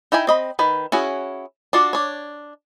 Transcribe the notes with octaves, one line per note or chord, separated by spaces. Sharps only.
D#4 E4 G5 G#5 B5
C4 D#5 B5
D#3 B4
C#4 E4 F#4 G#4
D4 F4 F#4 D5
D4 C#5